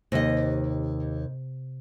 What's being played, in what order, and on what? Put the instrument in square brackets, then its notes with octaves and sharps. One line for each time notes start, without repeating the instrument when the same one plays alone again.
[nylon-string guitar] D#2 D#5 [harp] C3 A#6